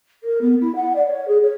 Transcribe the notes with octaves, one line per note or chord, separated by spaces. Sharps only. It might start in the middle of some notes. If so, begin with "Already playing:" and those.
A#4
B3
E4
F#5
D5
C#5
G#4
C#5